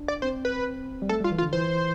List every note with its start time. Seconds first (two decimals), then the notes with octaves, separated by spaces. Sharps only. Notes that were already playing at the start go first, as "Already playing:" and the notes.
Already playing: D4
0.08 D5
0.22 C4 C5
0.45 B4
1.02 G3
1.09 A3 A4
1.20 G3 F4
1.32 E3
1.38 F4
1.42 D3
1.53 E3 C5